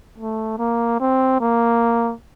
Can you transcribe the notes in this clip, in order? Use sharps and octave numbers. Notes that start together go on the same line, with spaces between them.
A3
A#3
C4
A#3